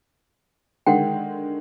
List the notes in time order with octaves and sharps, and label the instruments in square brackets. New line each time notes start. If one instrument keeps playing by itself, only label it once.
[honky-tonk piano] D3 D#3 G#3 [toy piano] F#5 G5